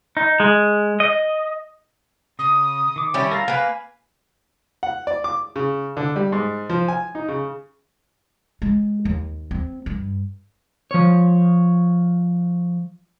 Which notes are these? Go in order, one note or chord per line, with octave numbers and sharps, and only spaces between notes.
D#4
G#3
D#5
C#3 D#6
D#3 D6
G3 C#4 E4 G5
A#4 F5 A5 A#5
A#3 B4 G#5 B5
F#5
D5
D6
C#3
D3
G3
G#2
F3
G#5
D#4
C#3
G#3
D#2
C4
G2
F3 C#5